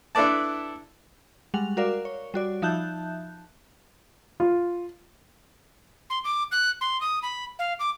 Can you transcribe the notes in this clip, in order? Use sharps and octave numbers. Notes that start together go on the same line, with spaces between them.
D4 E4 A4 B4 D5 A5
G3 G#3 F#5 F7
F#4 A#4 D5 F5
C#5
G3 F#4 D5
F3 D#4 E5 A5 F#6 G6
F4
C6
D6
F#6
C6
D#6
B5
F5
D6